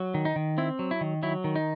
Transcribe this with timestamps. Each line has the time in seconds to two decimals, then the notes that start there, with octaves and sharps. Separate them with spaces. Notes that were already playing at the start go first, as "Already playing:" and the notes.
Already playing: F#3
0.14 D#3
0.25 D#4
0.36 D#3
0.58 C4 E4
0.79 F#3
0.91 E4
1.01 D#3
1.23 F#3 E4
1.44 D#3
1.56 D#4